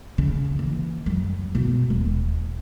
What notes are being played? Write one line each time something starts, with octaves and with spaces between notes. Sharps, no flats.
C#3
E3 A#3
F#2 G3
B2 D#4
D#1